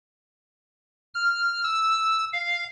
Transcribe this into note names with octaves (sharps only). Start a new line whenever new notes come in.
F6
E6
F5